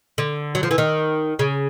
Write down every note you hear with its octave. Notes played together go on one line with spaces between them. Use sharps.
D3
F#3
F3
E3
D#3
C#3